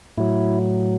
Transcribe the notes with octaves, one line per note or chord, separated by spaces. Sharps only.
A2 F#3 E4